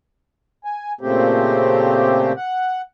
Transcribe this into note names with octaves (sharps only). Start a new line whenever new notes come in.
G#5
A#2 C#3 A3 C4 G4
F#5